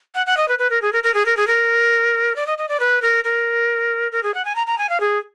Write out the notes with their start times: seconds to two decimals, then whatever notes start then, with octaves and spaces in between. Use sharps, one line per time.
0.15 F#5
0.27 F#5
0.37 D#5
0.48 B4
0.59 B4
0.70 A#4
0.82 G#4
0.93 A#4
1.04 A#4
1.14 G#4
1.26 A#4
1.37 G#4
1.47 A#4
2.36 D5
2.47 D#5
2.58 D#5
2.69 D5
2.80 B4
3.02 A#4
3.24 A#4
4.12 A#4
4.23 G#4
4.34 F#5
4.45 G#5
4.56 A#5
4.67 A#5
4.78 G#5
4.89 F5
5.00 G#4